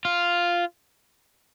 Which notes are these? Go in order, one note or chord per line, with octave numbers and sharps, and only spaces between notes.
F4